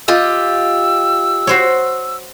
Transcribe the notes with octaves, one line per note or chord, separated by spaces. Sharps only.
F4 G4 D#5 E6
F#4 C5 C#5